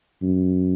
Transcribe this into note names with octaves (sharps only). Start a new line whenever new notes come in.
F#2